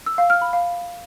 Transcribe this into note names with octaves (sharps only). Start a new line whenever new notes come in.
E6
F5
F6
B5
F5